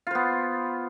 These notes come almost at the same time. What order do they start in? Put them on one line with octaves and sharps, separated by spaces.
F4 C5 B3